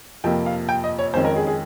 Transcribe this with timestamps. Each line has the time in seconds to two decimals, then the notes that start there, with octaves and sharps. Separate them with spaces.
0.24 F2 C3 F3 A#3 G5
0.46 F5
0.69 G5
0.84 D#5
0.99 C#5
1.14 F2 D#3 G#3 C#4 C5
1.25 A#4
1.36 G#4
1.47 G#4